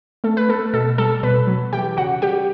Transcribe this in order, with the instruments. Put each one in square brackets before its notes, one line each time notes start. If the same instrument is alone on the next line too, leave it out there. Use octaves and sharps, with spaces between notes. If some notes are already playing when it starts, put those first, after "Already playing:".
[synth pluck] A3 A4
B4
A3 A4
B2 A4
G3 A4
B2 B4
F#3
E3 G4 G5
C#3 F#4 F#5
G3 G4 G5